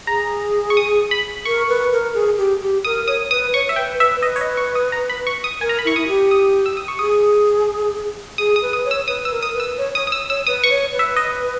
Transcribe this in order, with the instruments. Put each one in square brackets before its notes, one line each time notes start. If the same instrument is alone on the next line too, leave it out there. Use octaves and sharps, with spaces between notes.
[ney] G#4 [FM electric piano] A#5
[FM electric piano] C#6
D#6
B5
[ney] A#4 [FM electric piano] C#6
[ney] B4
A#4
G#4
G4
G4
[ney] A#4 [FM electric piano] D#6
[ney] C#5 [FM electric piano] D#6
[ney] B4 [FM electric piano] D#6
[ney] C#5 [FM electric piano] C#6
[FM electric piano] E5
[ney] B4 [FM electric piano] G5
[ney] B4 [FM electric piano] E5
[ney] B4 [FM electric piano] D#5
[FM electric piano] C#5
D#5
C#6
D#6
A#5
B5
C#6
D#6
[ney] A#4 [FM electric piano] G#5
[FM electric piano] A#5
B5
[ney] E4 [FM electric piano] C#6
[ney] E4 [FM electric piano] D#6
[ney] G4
[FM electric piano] D#6
E6
D#6
C#6
[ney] G#4 [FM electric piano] D#6
[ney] G#4 [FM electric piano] D#6
[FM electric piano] D#6
[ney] B4
[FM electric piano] D#6
[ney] C#5
[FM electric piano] E6
[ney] B4 [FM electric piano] D#6
[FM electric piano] E6
[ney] A#4
[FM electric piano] D#6
[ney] B4
[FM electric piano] E6
[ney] C#5
[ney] C#5 [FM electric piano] D#6
[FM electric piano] D#6
E6
[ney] C#5 [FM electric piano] E6
[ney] B4 [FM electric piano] D#6
[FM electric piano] C#6
[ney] C#5
B4
[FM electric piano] E5
D#5